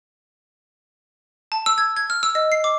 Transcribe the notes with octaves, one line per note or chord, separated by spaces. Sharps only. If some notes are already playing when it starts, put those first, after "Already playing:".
A5
E6
G#6
G#6
F6
E6
D#5
C7
D6